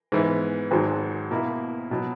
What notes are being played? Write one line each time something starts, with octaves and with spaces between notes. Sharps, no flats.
G#2 E3 B3
G#1 G#2 F#3
B2 A#3 E4
B2 F#3